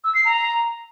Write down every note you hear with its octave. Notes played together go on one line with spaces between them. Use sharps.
E6
C7
A#5